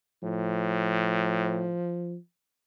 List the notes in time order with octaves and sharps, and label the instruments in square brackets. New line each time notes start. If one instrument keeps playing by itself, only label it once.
[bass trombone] A2 [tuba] F3